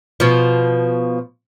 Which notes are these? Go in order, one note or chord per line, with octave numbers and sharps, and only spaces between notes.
B2 F3